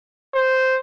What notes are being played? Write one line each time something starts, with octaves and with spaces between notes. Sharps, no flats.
C5